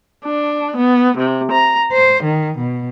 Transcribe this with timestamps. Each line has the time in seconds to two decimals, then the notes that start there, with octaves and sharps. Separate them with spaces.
0.25 D4
0.76 B3
1.17 C3
1.52 A#5
1.93 C5
2.23 D#3
2.59 B2